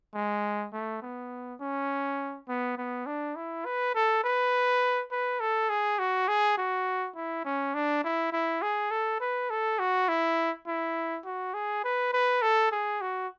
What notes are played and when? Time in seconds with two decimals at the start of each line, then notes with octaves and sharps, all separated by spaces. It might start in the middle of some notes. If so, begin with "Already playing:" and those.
0.15 G#3
0.73 A3
1.02 B3
1.61 C#4
2.48 B3
2.78 B3
3.06 D4
3.36 E4
3.65 B4
3.95 A4
4.24 B4
5.11 B4
5.40 A4
5.70 G#4
5.99 F#4
6.28 G#4
6.58 F#4
7.16 E4
7.45 C#4
7.74 D4
8.04 E4
8.33 E4
8.62 G#4
8.91 A4
9.21 B4
9.50 A4
9.79 F#4
10.09 E4
10.67 E4
11.26 F#4
11.54 G#4
11.84 B4
12.13 B4
12.42 A4
12.72 G#4
13.01 F#4